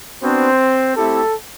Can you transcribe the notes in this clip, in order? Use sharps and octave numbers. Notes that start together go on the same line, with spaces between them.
B3 C4 D4 F#4 C5
A3 C4 E4 G4 A4